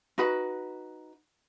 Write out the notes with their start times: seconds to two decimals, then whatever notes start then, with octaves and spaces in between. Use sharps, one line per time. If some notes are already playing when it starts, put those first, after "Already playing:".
0.18 D#4 F#4 B4 B5